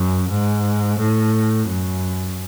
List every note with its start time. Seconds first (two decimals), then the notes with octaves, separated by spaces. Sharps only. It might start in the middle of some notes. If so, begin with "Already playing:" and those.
Already playing: F#2
0.29 G#2
0.99 A2
1.68 F#2